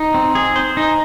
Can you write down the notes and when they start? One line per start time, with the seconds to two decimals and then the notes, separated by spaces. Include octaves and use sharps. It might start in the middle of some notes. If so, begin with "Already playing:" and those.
Already playing: D#4
0.14 C4
0.35 G#4
0.56 C5
0.77 D#4